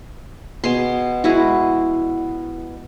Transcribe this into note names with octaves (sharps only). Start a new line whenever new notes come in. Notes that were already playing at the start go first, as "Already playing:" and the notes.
B2 G#4 C6
G#3 E4 F#4